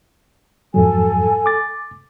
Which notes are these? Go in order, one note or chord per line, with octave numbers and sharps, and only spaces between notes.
F2 G#2 F#3 A4 G#5
D6 A6